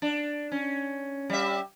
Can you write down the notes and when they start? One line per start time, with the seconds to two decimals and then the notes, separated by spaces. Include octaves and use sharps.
0.02 D4
0.52 C#4
1.30 G3 E5